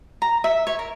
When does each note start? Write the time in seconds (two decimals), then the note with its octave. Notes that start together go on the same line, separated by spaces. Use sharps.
0.22 A#5
0.44 E5
0.67 C#5
0.79 A#4